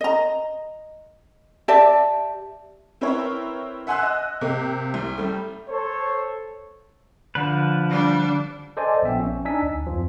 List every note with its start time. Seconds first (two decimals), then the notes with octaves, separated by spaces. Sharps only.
0.01 D#5 A#5
1.68 G4 D5 E5 A5
3.01 C4 E4 A#4 B4 C#5
3.87 E5 F#5 G#5 C6 E6 F#6
4.03 D#5
4.41 C3 A#3 G4
4.94 C2
5.18 G3 A3
5.69 A4 C5 C#5
7.35 D3 F3 B4
7.89 G3 D4
8.77 A4 C5 D5 D#5 G#5 A5
9.02 A#1 B3 E5 G5
9.20 C#4
9.45 D4 D#4 G#5 E6 B6
9.62 D2
9.87 F2 F3